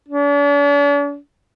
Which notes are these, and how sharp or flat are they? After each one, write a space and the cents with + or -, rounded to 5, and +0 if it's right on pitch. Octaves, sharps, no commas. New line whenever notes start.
D4 -45